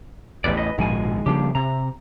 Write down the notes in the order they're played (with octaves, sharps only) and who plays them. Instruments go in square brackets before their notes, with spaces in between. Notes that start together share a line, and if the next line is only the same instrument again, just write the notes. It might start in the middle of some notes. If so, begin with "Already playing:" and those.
[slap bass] A1 E2 [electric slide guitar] G4 B4 D5
[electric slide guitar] B4 D#5
[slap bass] A#1 G#2 B2 [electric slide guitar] D#3 G#3 G#5
[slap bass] C#3 F3 G3 [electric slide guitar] A#3 D4 G4
[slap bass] C3 [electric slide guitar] A#5